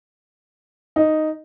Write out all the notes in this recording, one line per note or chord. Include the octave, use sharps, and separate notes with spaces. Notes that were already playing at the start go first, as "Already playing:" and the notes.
D#4